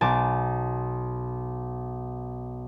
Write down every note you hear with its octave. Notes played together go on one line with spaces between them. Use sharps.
B1 G#5 A5 D6